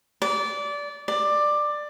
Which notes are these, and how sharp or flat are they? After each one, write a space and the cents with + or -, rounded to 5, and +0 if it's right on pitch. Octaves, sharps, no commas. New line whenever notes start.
D5 -20
D5 +15